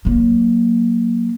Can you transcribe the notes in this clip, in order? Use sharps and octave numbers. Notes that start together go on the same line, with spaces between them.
F#3 A#3